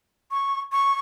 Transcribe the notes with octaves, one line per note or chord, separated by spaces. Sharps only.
C#6
C#6